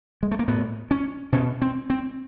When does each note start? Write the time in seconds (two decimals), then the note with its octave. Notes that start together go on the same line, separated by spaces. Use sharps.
0.23 G#3
0.31 A3
0.39 A#3
0.48 A2 B3
0.91 C#4
1.32 B2 C#4
1.62 C4
1.90 C4